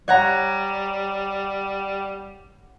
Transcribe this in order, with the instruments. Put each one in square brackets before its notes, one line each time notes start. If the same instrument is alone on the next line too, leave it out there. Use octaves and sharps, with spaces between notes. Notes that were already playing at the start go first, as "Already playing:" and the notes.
[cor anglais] G3 [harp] C#5 F#5 A#5